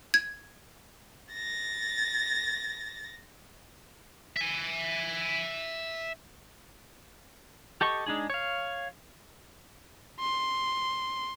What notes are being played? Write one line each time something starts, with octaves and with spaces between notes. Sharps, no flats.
G#6
A6 A#6
E5 G#5
G4 A4 D#5 C#6
G#3 D4 D#4 G#4
C#5 F5
C6